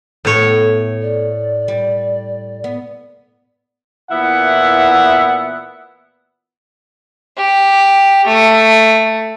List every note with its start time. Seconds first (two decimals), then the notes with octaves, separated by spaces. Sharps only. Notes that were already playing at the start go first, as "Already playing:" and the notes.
0.25 A2 A3 B3 A4 C#5
1.02 D5
1.68 G3
2.64 B3
4.11 A#2 E3 B3 E4 E5 F#5
7.37 G4
8.27 A3